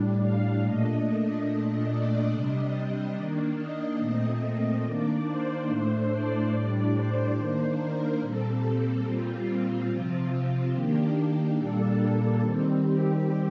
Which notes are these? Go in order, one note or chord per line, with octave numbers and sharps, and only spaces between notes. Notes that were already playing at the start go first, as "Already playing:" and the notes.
Already playing: A2 G3 D4
F5
A#2 A3 D4 D#5
A#2 A3 D4 D#5
D5
C3 G3 D4 D#5
D#3 A#3 D4
D#5
A#2 A3 C4
D#3 A#3 D4 D5
C5
A2 A3 D4
D5
A2 G3 D4
C5
D#3 A#3 D4
A#4
A#2 G3 C4 A4
A#2 G3 C4 F4
F4
C3 F3 C4
D#3 A#3 D4 G4
A#2 G3 A#3 D4 A4
D#3 G3 C4
G4